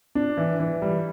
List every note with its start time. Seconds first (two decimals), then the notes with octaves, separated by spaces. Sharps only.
0.15 D4
0.37 E3
0.60 E3
0.82 G3